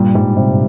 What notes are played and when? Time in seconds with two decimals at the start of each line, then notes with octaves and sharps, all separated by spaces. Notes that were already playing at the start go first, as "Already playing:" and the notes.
Already playing: G2 A#2 G3
0.15 G#2 G3
0.37 C3